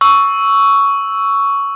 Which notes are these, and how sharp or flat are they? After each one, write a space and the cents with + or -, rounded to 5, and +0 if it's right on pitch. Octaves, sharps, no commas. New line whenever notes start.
C#6 +10 E6 -5